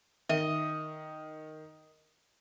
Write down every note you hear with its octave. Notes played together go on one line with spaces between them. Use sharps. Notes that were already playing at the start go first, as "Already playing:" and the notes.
D#3 D#5 E5